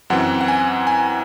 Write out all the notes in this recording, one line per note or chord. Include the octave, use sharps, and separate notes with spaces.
F#2 E3 C4 F#5
F#5
G#5
G#5